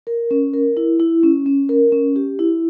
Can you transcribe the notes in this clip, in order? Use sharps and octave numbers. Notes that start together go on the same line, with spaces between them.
A#4
C#4
A#4
E4
E4
C#4
C#4
A#4
C#4
G4
E4